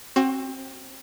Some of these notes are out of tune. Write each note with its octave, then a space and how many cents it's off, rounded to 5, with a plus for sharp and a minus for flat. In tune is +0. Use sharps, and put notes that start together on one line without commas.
C4 +25 F#4 +10